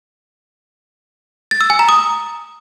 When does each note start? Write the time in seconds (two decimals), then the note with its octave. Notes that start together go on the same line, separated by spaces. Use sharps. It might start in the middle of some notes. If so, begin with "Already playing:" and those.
1.51 A6
1.61 E6
1.70 G#5
1.79 A#5
1.89 D#6